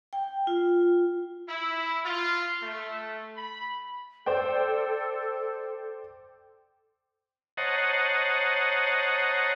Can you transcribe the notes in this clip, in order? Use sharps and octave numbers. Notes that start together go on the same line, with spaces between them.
G5
F4
E4
F4
A3
B5
A4 C5 D5 G5
C5 C#5 D#5 F#5 A5 A#5